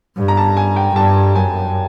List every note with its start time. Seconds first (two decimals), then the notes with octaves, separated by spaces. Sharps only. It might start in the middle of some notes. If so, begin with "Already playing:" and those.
0.17 G2
0.28 A#5
0.37 A5
0.57 G#5
0.76 G5
0.96 G2 A5
1.35 F#2 G#5